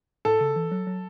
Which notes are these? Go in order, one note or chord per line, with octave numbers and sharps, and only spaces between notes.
A2 A4
C#3
E3
F#3
F#3